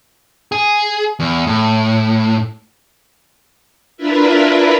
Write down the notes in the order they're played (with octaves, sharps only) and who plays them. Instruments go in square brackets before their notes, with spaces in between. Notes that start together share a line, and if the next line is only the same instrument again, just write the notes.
[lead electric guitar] G#4
E2
A2
[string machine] D4 E4 F4 A#4 B4 E5